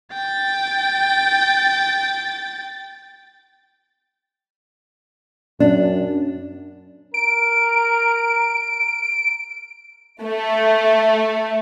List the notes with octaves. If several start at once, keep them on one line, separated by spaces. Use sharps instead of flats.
G5 A6
F#2 D4
A#4 D7
A3